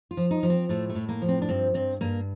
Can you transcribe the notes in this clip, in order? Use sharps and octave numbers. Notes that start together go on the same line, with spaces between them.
F4
F3
D#4
F3
C4
A2 A3
A3
A2
A#3
F3
C4
D4
G2 C4
G2 C4
G2 A#3